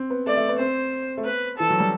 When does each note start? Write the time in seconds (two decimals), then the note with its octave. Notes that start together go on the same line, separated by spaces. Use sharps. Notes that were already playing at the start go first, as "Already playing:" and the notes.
Already playing: C4
0.10 B3
0.27 A3 D5
0.37 A3
0.49 B3
0.59 C4 C5
1.17 A3
1.24 B3 B4
1.58 E3 A4
1.70 F#3
1.80 G3